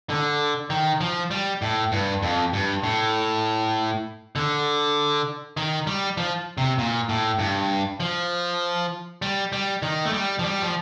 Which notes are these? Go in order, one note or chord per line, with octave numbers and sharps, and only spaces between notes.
D3
D#3
F3
G3
A2
G2
F2
G2
A2
D3
D#3
G3
F3
C3
A#2
A2
G2
F3
G3
G3
D#3
A3
G3
F3
G3
F3